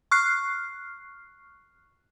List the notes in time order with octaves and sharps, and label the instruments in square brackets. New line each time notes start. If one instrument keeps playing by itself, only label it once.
[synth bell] C#6 F6 F#6 C7